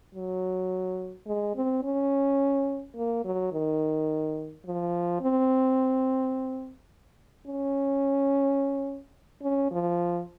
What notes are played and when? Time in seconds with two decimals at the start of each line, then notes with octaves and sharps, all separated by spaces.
0.15 F#3
1.27 G#3
1.56 C4
1.83 C#4
2.96 A#3
3.25 F#3
3.52 D#3
4.65 F3
5.21 C4
7.46 C#4
9.42 C#4
9.71 F3